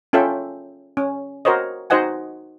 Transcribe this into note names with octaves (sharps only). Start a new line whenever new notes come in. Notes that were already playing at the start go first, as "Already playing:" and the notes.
C#4 F4 A4 E5 G5
C#4
F#4 A#4 C5 C#5 D#5
D#4 F#4 C5 D#5 F#5 G#5